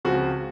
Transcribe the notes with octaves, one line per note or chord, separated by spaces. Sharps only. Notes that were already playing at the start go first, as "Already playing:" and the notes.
C#2 C#3 F3 C4 F#4